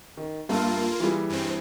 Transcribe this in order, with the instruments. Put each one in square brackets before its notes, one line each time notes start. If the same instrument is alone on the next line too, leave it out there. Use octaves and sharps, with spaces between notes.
[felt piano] D#3
[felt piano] G2 A3 F5 [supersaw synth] A#3 F4
[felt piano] E3 G3 G#4
[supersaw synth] G2 C4